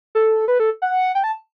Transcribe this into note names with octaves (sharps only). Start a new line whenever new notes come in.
A4
B4
A4
F#5
G5
A5